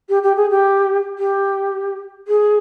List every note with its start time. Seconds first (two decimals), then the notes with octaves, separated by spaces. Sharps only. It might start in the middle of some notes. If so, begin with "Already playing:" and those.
0.09 G4
0.23 G4
0.36 G#4
0.50 G4
1.18 G4
2.27 G#4